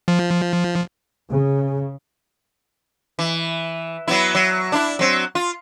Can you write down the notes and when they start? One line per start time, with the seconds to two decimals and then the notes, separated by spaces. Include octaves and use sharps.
0.08 F3
1.29 C#3
3.19 E3
4.08 F#3 B3 E4
4.35 F#3
4.72 D4 E4
4.99 F#3 C4
5.35 F4